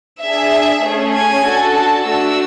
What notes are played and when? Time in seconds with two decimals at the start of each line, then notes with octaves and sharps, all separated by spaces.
0.23 D4 G#4 E5
0.83 A3 C#4 G#4
1.15 G#5
1.44 D4 F#4 A4
1.74 A5
2.05 A3 D4 F#4 E6